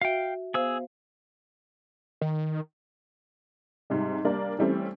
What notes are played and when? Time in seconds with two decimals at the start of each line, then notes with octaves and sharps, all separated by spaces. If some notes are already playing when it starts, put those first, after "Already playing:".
0.01 F#4 E5 F5 G5
0.54 B3 G#4 C5 F5 E6
2.21 D#3
3.90 G#2 C3 G3
4.25 G3 A#3 D4
4.59 E3 G3 A3 C4 C#4